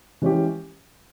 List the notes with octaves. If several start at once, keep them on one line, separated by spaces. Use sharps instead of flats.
E3 G#3 C#4 G4